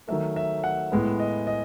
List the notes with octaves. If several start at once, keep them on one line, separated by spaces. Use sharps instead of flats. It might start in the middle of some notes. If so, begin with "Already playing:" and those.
D#3 F#3 A3 E5
E5
F#5
A2 G#3 B3
D#5
D#5